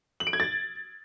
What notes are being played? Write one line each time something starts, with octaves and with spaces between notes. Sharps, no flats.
F#7
D7
G#6
A6